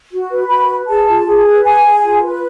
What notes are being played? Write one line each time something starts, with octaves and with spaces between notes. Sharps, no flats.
F#4
B4
F#4 B5
B4
G#4 A5
F4
G#4
B4
G#4 G#5
G#4
F4
B4